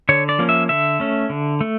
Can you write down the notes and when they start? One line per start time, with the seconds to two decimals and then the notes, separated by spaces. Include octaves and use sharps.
0.09 D3 C#5
0.29 D5
0.39 F3 A#3 C#4
0.49 E5
0.69 D3 E5
1.00 A3 C#4
1.30 D3
1.61 A3